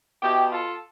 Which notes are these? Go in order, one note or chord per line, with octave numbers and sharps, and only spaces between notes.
B2 E4 G4
F4 A4